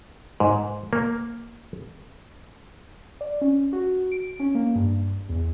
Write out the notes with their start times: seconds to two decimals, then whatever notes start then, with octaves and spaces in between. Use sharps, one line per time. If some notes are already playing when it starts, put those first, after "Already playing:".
0.40 G#2
0.93 A#3
3.21 D5
3.41 C#4
3.73 F#4
4.12 D7
4.40 C#4
4.55 A#3
4.75 G2
5.30 E2